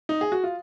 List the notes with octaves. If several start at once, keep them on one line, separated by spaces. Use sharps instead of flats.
D#4
G#4
F#4
F4